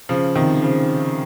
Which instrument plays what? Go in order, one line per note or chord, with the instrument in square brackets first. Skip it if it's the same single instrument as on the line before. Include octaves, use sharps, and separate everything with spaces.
[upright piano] C#3 F3
C3 D#3
C#3 F3